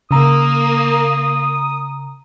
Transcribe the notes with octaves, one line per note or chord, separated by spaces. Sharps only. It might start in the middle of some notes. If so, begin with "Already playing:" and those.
C#3 A#3 A#5 D#6